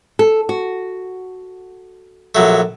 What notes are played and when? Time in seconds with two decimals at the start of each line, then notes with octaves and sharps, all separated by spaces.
0.19 A4
0.49 F#4
2.35 A#1 F#3 A3